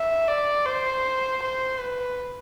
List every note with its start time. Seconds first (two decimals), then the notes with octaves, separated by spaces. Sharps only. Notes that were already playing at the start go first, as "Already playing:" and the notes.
Already playing: E5
0.28 D5
0.66 C5
1.42 C5
1.80 B4